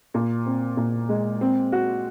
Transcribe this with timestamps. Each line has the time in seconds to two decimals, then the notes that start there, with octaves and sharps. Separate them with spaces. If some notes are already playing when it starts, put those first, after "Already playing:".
0.14 A#2
0.46 C4
0.77 A#2
1.09 G#3
1.41 C4
1.72 F#4